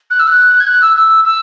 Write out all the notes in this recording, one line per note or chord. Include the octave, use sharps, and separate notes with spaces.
F#6
E6
F#6
G#6
F#6
E6
E6
E6